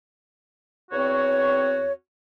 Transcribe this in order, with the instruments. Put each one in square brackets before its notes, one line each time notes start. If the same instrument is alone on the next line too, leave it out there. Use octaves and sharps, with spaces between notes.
[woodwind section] E2 C4 F#4 C#5